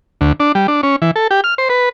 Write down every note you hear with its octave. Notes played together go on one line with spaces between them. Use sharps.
D2
D4
G3
D4
C#4
E3
A4
G4
F6
C5
B4